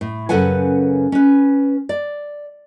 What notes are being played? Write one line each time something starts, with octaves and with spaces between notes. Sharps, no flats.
A2
F#2 C#3 A4 B4 F#5 G#5
C#4 B4
D5